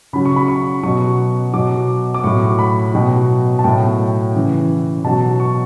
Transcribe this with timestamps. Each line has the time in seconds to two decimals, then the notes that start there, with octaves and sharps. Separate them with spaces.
0.13 C#3 F#3 B5
0.25 C#6
0.36 B5
0.48 C#6
0.83 B2 F#3 C#6
1.53 B2 F#3 D6
2.14 D6
2.24 A2 F#3 C#6
2.59 B5
2.94 B2 F#3 G5
3.59 A5
3.64 A2 F#3 G5
4.34 C#3 E3
5.04 B2 F#3 A5
5.40 C#6